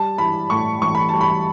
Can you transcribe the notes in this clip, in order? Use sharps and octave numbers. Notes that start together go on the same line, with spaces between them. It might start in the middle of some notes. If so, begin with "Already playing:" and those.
Already playing: G3 A5
E3 B5
A2 C#6
A1 C#6
B5
A5
G3
B5